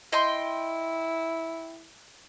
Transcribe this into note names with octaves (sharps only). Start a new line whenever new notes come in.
E4 D#5 G5 C6